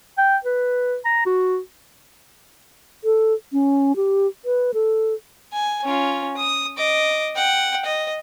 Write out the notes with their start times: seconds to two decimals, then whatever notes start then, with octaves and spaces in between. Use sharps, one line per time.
0.18 G5
0.45 B4
1.05 A#5
1.26 F#4
3.04 A4
3.53 C#4
3.96 G4
4.45 B4
4.74 A4
5.53 G#5
5.84 C#4 F4
6.37 D#6
6.77 D#5 D6
7.36 F#5 G5
7.85 D#5